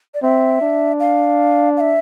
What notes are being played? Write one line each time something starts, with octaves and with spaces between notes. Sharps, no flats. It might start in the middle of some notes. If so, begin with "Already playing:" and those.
D5
C4 E5
D4
F5
F5
E5